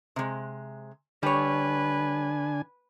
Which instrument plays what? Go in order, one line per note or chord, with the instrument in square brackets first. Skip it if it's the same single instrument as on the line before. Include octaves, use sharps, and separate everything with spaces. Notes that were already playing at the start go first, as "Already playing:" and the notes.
[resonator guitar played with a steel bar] C3 G#3
[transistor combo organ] D3 D4 G#5 [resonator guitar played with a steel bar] G3 C#5 [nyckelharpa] B4